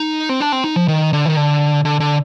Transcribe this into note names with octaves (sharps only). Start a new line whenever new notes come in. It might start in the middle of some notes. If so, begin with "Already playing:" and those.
Already playing: D#4
C4
D4
C4
D#4
F3
D#3
D3
D#3
D3
D3
D3